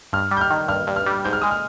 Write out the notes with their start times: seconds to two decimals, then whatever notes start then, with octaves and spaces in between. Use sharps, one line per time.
0.13 G2 F6
0.31 G3
0.37 G6
0.41 F6
0.50 D#3
0.68 G2 F6
0.87 G2
0.96 F6
1.06 G3
1.24 G#2 G6
1.33 F6
1.42 G#3 D#6
1.51 F6